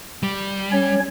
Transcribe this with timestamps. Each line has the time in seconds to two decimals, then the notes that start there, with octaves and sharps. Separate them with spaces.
0.23 G3
0.72 C#4 C#5